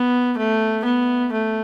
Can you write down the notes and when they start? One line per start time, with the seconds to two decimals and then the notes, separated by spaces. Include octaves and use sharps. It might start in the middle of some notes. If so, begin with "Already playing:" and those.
Already playing: B3
0.37 A3
0.85 B3
1.32 A3